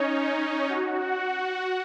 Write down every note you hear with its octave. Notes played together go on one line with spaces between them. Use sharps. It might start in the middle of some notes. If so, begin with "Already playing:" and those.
Already playing: C#4 D#4 C#5
D#4
F#4
F#5
F#5